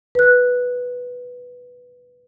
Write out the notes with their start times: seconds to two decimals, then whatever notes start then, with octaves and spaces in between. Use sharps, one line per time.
0.15 B4 F#6